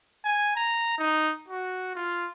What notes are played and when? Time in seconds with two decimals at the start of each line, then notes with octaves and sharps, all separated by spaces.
0.25 G#5
0.56 A#5
0.99 D#4
1.48 F#4
1.96 F4